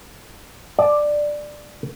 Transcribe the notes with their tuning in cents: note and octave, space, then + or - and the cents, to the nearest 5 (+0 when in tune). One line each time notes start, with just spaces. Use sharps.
D5 +10 A5 -35